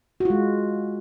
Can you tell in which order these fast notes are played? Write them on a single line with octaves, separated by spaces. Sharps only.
F#4 F4 G#3